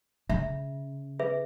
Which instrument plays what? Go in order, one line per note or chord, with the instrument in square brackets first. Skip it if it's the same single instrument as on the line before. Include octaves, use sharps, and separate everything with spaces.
[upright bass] C#3 [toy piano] E5
[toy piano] G#4 B4 E5